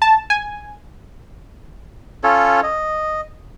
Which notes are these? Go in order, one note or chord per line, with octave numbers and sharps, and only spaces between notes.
A5
G#5
C#4 F4 A4 C#5
D#5